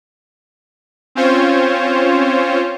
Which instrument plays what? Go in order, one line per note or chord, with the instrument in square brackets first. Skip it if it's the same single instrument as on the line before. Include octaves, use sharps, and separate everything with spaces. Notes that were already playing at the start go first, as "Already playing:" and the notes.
[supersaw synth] C4 C#4 F4 C5 C#5